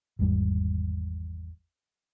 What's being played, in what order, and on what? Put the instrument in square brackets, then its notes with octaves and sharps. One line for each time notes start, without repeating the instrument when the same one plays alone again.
[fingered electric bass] G#1 E2 G#2 G3